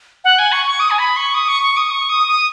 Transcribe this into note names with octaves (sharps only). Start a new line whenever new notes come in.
F#5
G#5
C#6
C#6
D#6
G#5
B5
C#6
D#6
C#6
C#6
D#6
C#6
D#6
D#6